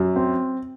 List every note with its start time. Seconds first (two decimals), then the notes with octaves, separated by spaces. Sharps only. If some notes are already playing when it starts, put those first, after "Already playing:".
Already playing: F#2
0.16 C4